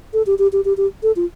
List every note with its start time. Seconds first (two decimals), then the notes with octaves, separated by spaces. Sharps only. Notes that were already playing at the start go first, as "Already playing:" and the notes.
0.13 A4
0.26 G4
0.39 G4
0.52 G4
0.65 G4
0.77 G4
1.03 A4
1.16 F4